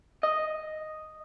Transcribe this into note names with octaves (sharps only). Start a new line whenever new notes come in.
D#5